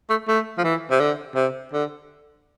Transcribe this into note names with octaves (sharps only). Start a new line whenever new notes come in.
A3
A3
F3
E3
C3
D3
C3
D3